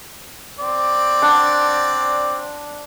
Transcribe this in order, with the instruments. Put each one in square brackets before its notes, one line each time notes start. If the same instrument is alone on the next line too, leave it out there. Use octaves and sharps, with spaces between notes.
[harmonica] C4 D5
[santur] D4 F#5